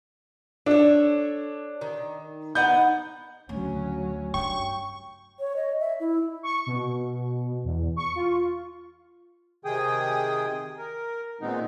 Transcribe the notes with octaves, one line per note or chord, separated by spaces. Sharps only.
D4 A4 C#5
D#3
B3 D#4 F#5 G6
D2 C#3 F#3 C#4
G2 G5 C#6
C#5
D#5
E5
E4
C#6
B2
E2
C#6
F4
C3 D#3 G#4 G5 D#6
A#4
A#2 D#3 G#3 B3 C4 D#4